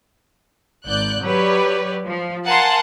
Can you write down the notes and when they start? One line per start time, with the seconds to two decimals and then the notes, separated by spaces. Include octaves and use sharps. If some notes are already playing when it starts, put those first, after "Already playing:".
0.87 G#1 D5 F#6 G6
1.24 F#3 G4 B4 C#5 D5
2.06 F3
2.46 A#4 F5 F#5 G#5 A5 C6